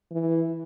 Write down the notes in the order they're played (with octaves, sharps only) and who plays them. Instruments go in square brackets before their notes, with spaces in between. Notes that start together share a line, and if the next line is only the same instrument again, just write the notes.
[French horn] E3